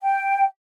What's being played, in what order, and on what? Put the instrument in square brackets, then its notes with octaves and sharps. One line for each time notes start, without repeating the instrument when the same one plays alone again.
[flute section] G5